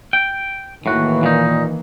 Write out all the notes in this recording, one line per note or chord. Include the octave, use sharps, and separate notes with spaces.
G5
A2 D#3 E3 A#3 F#4
A#2 D#4